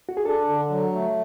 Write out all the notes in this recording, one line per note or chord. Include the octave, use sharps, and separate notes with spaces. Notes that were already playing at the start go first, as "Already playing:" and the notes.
F#4
G#4
D4 A4
D3
F#3
A3